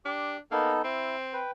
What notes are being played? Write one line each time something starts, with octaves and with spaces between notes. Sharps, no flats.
D4 G4
A#3 B3 D#4 A4
C4 E4
B4 G5